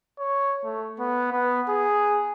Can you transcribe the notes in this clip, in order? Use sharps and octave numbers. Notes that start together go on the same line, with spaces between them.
C#5
A3
B3
B3
G#4